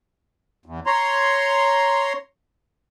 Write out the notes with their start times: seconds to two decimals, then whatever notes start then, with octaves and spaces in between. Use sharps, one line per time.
0.66 E2
0.87 C#5 A#5 C6